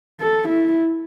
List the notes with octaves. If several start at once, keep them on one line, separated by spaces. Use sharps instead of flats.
A4
E4